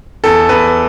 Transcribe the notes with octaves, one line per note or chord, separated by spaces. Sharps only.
E2 A4
E2 B4